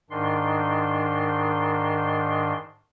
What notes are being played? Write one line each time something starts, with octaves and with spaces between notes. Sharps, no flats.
G#2 D#3 D4 C6